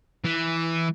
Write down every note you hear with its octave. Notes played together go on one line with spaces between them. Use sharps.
E3